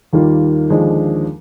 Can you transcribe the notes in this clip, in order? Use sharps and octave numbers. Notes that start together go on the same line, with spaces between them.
D#2 D#3 G3 A#3 F4
D#2 D3 F3 G#3 D4